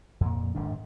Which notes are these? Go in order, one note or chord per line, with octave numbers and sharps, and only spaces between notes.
F2 A#2
D1 G#2 D#3 D4